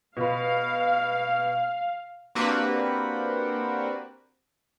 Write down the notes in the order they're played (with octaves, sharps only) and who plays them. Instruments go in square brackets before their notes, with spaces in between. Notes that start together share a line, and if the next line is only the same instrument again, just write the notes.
[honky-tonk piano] B2 B5 [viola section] F5
[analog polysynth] A#3 C4 D4 F#4 G4 B4